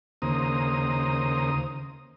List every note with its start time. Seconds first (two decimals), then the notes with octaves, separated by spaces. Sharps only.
0.22 D#2 C#3 A#3 C5 A#5 D#6